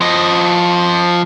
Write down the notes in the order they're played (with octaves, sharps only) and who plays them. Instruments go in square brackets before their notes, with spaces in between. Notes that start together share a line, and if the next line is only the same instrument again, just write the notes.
[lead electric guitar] F3 D#5